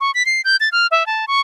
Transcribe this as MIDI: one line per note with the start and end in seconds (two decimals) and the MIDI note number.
0.01 0.11 85
0.14 0.25 95
0.26 0.41 96
0.45 0.57 91
0.60 0.69 93
0.72 0.87 89
0.91 1.06 76
1.06 1.25 81
1.28 1.40 85